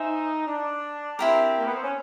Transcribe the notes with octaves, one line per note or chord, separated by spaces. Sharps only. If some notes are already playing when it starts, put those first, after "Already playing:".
Already playing: D#4 C5 E5 G#5
D4
C4 E4 G4 A#4
A#3
B3
C4
C#4